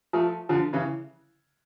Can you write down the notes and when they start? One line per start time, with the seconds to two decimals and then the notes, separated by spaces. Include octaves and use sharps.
0.13 F3 A3
0.49 D3 F3
0.73 C#3 E3